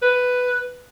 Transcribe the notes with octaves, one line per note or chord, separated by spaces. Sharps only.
B4